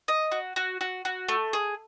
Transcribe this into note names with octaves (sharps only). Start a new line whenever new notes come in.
D#5
F#4
F#4
F#4
F#4
A3
G#4